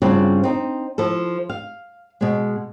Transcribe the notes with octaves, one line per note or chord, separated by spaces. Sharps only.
G2 C#3 C4 F4 F#4
C4 D#4
F3 E4 A4
F5
B2 G#3